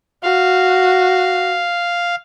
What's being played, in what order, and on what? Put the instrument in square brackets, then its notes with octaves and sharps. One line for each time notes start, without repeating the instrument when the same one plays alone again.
[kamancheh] F#4 [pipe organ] F5